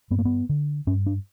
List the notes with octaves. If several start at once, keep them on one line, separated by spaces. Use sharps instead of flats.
G2 B3
A#3
B3
D3
G2 C#4
D4